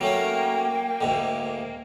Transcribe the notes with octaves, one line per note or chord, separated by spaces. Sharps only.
F#3 A3 A#3 C#4 G5
D2 G#2 D3